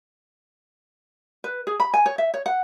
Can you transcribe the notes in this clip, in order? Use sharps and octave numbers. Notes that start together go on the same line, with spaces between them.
B4
G#4
B5
G#5
C#5
E5
C#5
F#5